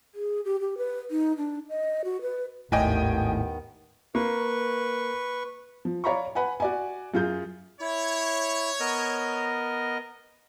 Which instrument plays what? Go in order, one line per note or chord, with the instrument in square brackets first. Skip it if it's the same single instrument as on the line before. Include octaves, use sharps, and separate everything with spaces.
[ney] G#4
G4
G4
B4
D#4
D4
D#5
F#4
B4
[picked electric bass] G#1 A2 [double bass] D#2 [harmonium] D#3 B3 [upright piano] D#5 G5 G#5
[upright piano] A#3 [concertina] B4 C#6
[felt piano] F3
C#5 D5 F5 A#5 B5 C#6
B4 F#5 G#5
F#4 D5 G#5
F#2 F4 G#4 G6
[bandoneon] E4 [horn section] C#5
[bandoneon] B3 A#4 D#5